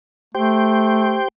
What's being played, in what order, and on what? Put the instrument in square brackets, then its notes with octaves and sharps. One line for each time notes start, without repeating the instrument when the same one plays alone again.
[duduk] A3 [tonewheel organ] G4 C5 G5